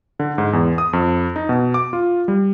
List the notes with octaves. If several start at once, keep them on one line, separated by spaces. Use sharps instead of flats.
D3
G#2
E2
D#6
F2
D#4
B2
D6
F4
G3